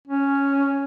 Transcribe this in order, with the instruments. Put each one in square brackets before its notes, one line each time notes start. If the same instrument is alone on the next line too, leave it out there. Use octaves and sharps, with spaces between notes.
[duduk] C#4